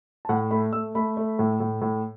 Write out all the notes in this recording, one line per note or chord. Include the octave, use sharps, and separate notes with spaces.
A5
A2 F#5
A3 B5
A3 E6
A3 B5
A3
A2
A2
A2